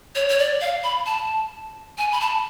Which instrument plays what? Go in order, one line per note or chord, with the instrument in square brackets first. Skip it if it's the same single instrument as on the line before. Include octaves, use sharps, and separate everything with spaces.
[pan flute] C#5
C#5
D5
F5
B5
A5
G#5
B5
A5